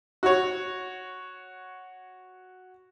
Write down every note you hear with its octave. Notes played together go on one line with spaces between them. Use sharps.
F#4 C#5